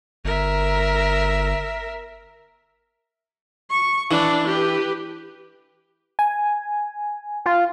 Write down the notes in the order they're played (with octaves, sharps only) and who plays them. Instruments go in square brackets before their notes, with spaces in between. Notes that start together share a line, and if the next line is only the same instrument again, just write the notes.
[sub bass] G1 [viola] A#4 E5
[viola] C#6
[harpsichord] E3 [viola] D4
[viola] G4 B4
[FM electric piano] G#5
[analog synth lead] F4